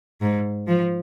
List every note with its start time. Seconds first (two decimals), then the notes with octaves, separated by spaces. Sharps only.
0.21 G#2
0.68 F3